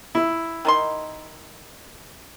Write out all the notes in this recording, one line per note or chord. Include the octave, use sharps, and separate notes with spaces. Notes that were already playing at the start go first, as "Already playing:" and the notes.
E4
D#3 D#4 C6